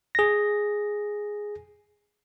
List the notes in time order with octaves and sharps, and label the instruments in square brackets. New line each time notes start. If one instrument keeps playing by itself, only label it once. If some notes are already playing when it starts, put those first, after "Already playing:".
[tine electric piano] G#4 A#6